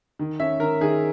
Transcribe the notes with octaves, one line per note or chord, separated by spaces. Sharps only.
D#3
C#4 E5
D#3 A#4
D#3 G#4